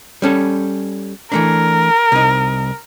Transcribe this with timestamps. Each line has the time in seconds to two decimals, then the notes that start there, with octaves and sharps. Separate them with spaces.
0.22 G3 C#4 A4
1.32 E3 A3 D4 A#4
2.12 C2 D#4